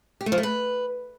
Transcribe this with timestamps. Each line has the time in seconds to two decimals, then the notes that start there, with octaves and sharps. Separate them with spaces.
0.21 G4
0.26 A3
0.32 F3
0.38 A3
0.43 B4